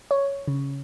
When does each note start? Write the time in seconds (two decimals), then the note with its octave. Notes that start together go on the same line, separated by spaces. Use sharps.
0.11 C#5
0.48 C#3